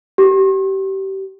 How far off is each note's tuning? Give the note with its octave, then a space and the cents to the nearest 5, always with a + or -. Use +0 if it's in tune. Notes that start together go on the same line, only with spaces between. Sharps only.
G4 -25